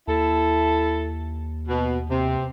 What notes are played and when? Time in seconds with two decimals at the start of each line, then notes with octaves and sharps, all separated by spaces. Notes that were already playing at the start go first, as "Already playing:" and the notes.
0.08 D#2 E4 A4
1.68 B2
2.10 C3